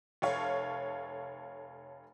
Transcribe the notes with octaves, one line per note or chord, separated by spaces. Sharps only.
F1 A4 C#5 F5